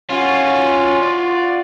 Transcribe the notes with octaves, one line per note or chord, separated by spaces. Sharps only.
C#4 F4 F#4
D5